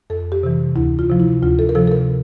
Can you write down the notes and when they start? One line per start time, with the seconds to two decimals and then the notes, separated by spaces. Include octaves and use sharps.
0.10 F2 A4
0.32 G4
0.43 C3 E3
0.76 D2 E4
0.99 F4
1.10 C3 F3
1.20 E4
1.43 D2 F4
1.59 A4
1.69 A#4
1.75 C3 F3 A4
1.87 A4
1.91 A#4